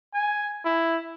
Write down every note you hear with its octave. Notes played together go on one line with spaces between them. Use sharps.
G#5
E4